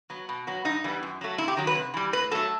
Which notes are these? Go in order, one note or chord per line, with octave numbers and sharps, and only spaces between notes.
F#3 B3
B2
F#3 B3
G2 D#4
E3 G3 B3
F#2
F#3 A3
C3 E4
G4
D#3 F#3
B4
C3
E3 G3
A2 B4
F#3 A3 A4